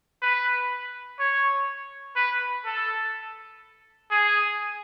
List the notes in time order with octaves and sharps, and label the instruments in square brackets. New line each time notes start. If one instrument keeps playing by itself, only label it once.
[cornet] B4
C#5
B4
A4
G#4